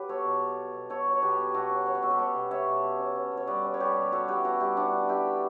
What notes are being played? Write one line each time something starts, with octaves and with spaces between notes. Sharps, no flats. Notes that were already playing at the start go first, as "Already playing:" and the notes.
Already playing: F#3 G4 B4
B3 A4 C#5
B2
B3
B3
B2
B2 A4 C#5
F#3
C#5
B2 G4 B4
B3
B2 F#4 A4
C#4
C#4 C#5
B4
B2 A4
G4 B4
B2 A4 C#5
B2
C#4 C#5 E5
B2
B2
C#4
C#4
B2
C#5
G3 B4 D5
C#4
C#5
G3 G4 B4
B2
B3 F#4 A4
E3 G4 B4
B3 F#4 A4
G3 E4 G4
G3 D4 F#4
E3
D4 E4 G4
B3